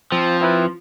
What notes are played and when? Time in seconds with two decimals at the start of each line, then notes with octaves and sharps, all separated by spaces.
0.12 F3 C4
0.41 C4 E4 B4